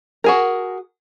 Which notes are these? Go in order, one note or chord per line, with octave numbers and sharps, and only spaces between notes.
F#4 G#4 A#4